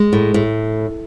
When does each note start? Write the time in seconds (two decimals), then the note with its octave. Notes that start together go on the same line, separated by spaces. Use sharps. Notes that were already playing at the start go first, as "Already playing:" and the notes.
Already playing: G#3
0.13 A2
0.34 A2